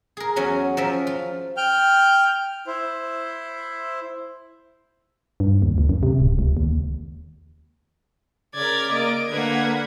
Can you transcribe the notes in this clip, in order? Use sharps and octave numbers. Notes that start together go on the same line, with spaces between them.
G#4 A#4
E2 F#3 C#4
F3 C#4 A#4 E5
F4
G5 F6 G6
E4 C5
G2
D#2
C#2
F#2
C3
D1
C#2
D#2
C#3 A#4 D5 G#6 B6
A#3 D#5 D7
D3 A#3 B4 F#5 G#6